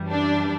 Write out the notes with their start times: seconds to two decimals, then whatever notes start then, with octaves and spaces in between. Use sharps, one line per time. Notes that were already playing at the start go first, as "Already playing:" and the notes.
Already playing: F#2 E3 G3
0.10 D4